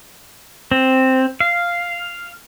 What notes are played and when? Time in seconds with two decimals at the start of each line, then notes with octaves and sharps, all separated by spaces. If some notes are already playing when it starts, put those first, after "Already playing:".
0.72 C4
1.40 F5